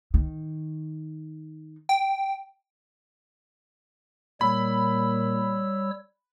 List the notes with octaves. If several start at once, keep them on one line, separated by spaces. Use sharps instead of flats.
D#3
G5
A#2 G3 C#5 B5 E6